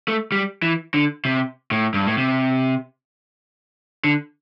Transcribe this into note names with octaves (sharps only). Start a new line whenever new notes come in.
A3
G3
E3
D3
C3
A2
G2
A2
C3
D3